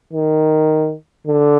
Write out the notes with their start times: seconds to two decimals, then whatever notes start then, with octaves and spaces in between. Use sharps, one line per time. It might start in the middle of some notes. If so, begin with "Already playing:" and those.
0.13 D#3
1.27 D3